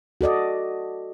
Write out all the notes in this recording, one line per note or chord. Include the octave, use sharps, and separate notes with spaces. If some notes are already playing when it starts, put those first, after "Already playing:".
F#4 A4 D5 D#5